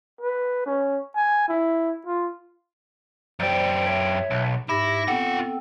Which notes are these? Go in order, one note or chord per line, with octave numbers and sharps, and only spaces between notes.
B4
C#4
G#5
E4
F4
F#2 G4 C5 D5
C#5 E5
B1
G#2 E4 G4 A#6
B3 C4 F4 A4 F#5